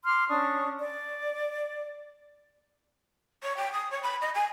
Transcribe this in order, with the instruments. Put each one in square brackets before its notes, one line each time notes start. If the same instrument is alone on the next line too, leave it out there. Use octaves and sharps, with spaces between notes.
[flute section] C6 D6 F6
C#4 D4 C#6 D#6
D5
[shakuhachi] C#5
G5
D#6
C#5
B5
D#5
G#5